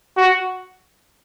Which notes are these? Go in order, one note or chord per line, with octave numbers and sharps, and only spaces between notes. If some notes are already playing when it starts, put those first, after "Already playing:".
F#4